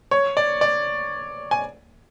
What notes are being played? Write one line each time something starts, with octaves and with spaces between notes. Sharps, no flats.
C#5
D5
D5
G#5